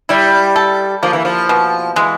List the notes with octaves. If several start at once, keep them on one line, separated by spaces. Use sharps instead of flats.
G3 E4
A4
F3 A#3
E3
F3
B2
E3 G#3